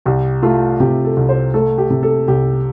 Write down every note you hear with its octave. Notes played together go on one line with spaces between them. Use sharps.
C2 G4
A3 F4
C3 G4
A4
C2
C5
A3 A4
G4
C3
A4
C2 G4